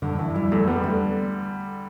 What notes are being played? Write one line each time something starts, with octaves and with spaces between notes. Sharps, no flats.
G2 D3
G2 E3
G3 E4
E2 A3
G3 B3
D3 A3